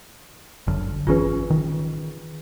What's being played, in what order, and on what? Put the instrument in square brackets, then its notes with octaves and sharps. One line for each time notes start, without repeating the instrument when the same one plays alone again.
[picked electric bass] G1 F#2 D3
[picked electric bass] G#1 E3 C#4 [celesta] F4 G#4 B4
[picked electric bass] D#3